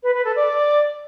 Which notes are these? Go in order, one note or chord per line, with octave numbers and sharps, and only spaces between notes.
B4
B4
A4
D5